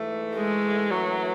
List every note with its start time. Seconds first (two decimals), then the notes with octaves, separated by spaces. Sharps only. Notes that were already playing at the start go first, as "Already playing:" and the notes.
Already playing: G#2 E3 A3
0.36 G#3
0.90 F#2 E3 F#3 A3